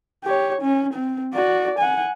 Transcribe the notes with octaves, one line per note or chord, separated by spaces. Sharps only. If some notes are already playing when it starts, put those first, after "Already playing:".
G4 C#5
C#4
C4
F#4 D5
F#5 G#5